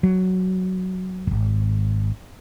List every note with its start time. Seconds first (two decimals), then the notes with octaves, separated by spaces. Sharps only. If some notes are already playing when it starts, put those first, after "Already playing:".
0.03 F#3
1.27 D1 G#1